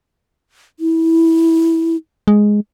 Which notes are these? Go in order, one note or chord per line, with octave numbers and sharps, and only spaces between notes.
E4
G#3